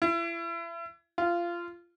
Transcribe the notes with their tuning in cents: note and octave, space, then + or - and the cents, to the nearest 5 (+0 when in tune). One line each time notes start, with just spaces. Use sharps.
E4 +35
F4 -20